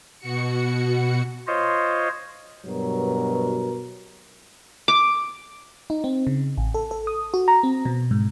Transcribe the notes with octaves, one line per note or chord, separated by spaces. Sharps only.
B2 F#4 C#7
F4 C5 C#5 D#5
G2 B2 F#3 A#4
D6
D#4
C4
C#3
A1
A4
A4
D#6
F#4
A#5
C4
B2
G#2